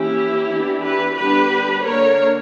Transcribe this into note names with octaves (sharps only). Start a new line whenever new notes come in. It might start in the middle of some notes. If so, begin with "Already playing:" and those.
Already playing: E3 A#3 C#4 E4 G4
E3 B3 D4
G4 B4
D3 G3 B3 D4 G4 B4
D3 A#3 D4 A#4 C#5